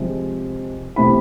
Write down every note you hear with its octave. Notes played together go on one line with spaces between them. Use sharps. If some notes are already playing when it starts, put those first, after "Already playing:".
Already playing: C3 F3 G#3
C3 E3 A3 B5